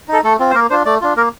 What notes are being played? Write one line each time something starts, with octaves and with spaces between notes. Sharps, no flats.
D#4 A4
A3 A4
C4 F4
C5
A#3 A#4
D4 F4 C5
A3 D5
D4 F4
A#3 A#4